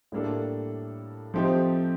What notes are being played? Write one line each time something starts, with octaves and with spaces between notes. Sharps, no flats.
A2 G3 A#3 D4 A4
F3 A3 C4 D#4 G4